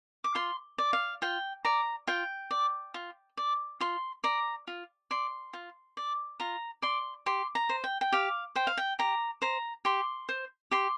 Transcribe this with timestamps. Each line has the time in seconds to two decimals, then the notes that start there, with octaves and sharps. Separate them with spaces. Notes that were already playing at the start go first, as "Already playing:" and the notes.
0.24 D6
0.35 F4 C6
0.78 D5
0.93 F5
1.22 F4 G5
1.65 D5 A#5
2.07 F4 G5
2.51 D5
2.94 F4
3.37 D5
3.80 F4 C6
4.24 D5 A#5
4.67 F4
5.11 D5 C6
5.53 F4
5.97 D5
6.40 F4 A#5
6.82 D5 C6
7.26 G4 C6
7.55 A#5
7.69 C5
7.84 G5
8.01 G5
8.12 G4 F5
8.55 C5 G5
8.67 F5
8.77 G5
8.99 G4 A#5
9.42 C5 A#5
9.85 G4 C6
10.29 C5
10.71 G4 C6